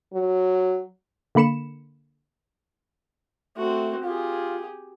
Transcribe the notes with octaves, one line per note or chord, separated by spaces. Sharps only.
F#3
D3 A#3 B5 C#7 E7
A3 C4 F#4
F4 G4 G#4